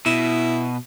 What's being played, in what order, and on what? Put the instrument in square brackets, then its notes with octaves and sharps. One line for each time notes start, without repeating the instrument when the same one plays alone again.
[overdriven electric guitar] B2 [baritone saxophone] E4